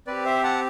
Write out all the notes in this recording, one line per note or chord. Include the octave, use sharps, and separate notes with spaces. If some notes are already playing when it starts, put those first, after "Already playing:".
C4 G4 B4 D5
C5 E5
F#5 A5